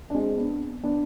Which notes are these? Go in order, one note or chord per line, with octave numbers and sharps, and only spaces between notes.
D4
G#3 C4
B3 D4
B3 D4